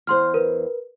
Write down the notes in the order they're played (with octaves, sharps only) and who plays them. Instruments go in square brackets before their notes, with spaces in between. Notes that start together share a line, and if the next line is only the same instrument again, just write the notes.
[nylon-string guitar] E2 C5 [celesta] C6 F6
[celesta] A#4 B4